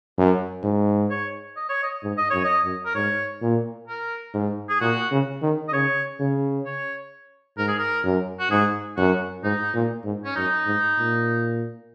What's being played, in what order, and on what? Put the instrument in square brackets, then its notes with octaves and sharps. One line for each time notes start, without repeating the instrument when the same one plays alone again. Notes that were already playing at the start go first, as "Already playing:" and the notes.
[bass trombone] F#2
G#2
[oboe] C#5
D#5
C#5
D#5
[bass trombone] G#2
[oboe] D#5
[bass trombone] F#2 [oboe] C#5
[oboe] D#5
[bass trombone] F#2
[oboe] A#4
[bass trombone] G#2 [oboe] C#5
[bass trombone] A#2
[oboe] A#4
[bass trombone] G#2
[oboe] G#4
[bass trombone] A#2 [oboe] F#4
[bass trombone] C#3
D#3
[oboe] D#5
[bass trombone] C#3 [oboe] C#5
[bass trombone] C#3
[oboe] C#5
[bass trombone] G#2 [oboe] A#4
[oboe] G#4
A#4
[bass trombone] F#2
[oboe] F#4
[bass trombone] G#2 [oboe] G#4
[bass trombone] F#2 [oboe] F#4
[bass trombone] G#2 [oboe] D#4
[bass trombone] A#2
G#2
[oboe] C#4
[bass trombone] F#2 [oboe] D#4
[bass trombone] G#2
A#2